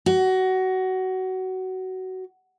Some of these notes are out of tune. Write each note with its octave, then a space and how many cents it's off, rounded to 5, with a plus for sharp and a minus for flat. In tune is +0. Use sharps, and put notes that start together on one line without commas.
F#4 +20